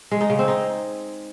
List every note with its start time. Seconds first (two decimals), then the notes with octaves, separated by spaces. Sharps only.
0.11 G#3
0.21 D#4
0.30 C#3
0.39 C4
0.48 D#4